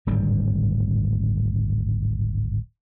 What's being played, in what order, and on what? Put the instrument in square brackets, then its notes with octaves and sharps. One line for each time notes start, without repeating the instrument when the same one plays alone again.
[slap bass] D1 G#1 G2 G3